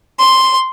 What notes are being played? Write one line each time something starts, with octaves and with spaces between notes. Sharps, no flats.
C6